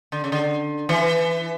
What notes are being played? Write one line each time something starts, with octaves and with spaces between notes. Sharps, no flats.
D3
C#3
D3
E3